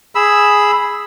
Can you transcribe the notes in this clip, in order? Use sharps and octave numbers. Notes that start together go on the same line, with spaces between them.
G#4 B5 E6